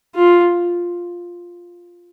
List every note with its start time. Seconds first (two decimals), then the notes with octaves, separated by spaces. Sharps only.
0.15 F4